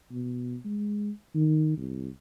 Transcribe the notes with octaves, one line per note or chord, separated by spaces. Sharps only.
B2
G#3
D#3
C2